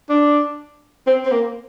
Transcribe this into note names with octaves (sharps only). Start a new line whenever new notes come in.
D4
C4
C4
A#3